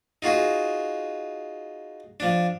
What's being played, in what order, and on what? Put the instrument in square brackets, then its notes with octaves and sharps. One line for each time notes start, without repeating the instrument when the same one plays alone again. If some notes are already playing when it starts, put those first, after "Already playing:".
[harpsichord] D#4 F4 F#4 G#4
F3 D4